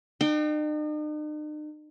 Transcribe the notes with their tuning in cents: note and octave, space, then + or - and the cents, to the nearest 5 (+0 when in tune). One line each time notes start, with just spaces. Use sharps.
D#4 -45 G5 +0